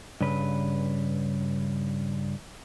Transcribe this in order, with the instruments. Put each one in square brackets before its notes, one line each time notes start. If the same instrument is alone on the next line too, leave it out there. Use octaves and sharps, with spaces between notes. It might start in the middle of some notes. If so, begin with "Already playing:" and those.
[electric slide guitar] G2 C#3 B4